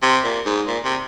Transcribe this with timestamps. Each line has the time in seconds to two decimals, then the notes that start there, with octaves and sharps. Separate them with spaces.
0.02 C3
0.24 A#2
0.46 G#2
0.67 A#2
0.84 C3